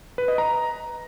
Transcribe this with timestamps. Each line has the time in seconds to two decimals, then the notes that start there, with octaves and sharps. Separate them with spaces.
0.18 B4
0.28 D#5
0.38 A#5